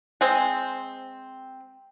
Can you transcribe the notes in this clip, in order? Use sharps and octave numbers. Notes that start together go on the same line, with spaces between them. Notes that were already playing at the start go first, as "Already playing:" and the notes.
G#3 C4